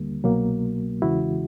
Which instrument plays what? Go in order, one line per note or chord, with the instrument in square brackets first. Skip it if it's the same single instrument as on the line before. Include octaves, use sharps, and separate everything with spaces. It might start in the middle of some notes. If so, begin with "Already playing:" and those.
Already playing: [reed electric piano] D#2 D3 G3 A#3
C2 B2 F#3 A#3
E2 C#3 E3 G#3 E4 F#4